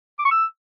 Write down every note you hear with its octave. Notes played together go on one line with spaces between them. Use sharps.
D6
C#6
E6